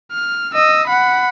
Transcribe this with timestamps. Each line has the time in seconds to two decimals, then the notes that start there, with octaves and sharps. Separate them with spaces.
0.12 F6
0.54 D#5 E6
0.87 F#5 B5